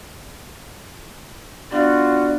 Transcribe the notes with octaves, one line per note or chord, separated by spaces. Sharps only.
B3 D4 F4 F#4 D5